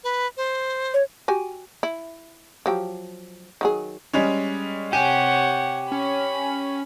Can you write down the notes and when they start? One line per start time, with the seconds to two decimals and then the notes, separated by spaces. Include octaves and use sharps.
0.04 B4
0.37 C5
0.94 C#5
1.28 F#4 G4 G#5
1.83 E4
2.66 F3 F#3 G4
3.61 D#3 F#3 G#4
4.13 G3 G#3 C#4
4.93 C3 G4 C#5 F#5 G#5
5.92 C#4 B5